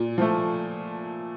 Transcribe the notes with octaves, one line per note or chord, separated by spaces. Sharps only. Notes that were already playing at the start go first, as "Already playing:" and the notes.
Already playing: A#2
F3 A3